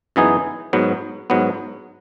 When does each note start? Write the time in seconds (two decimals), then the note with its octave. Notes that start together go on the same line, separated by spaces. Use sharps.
0.16 F#2 E3 B3 D#4 G#4
0.73 G#2 F#3 B3
1.30 G#2 F#3 B3